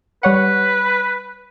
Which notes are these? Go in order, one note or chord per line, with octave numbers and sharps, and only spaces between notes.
G3 B4 C#5 F#5